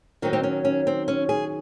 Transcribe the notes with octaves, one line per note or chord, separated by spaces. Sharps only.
D#3 F#3 C4 D#4
C4
C#4
C#4
C4
C#4
G#4